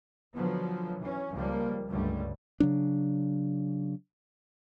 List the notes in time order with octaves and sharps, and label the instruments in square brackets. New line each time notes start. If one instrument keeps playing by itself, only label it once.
[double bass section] D3 F3 F#3 B3
E3 C#4
C#2 F3 G3 A#3
C#2 G2 D3 G3 A3
[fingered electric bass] C#3 F#3 D4